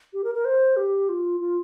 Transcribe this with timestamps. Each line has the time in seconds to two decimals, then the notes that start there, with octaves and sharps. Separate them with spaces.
0.13 G4
0.24 A#4
0.35 A#4
0.45 C5
0.76 G4
1.09 F4
1.40 F4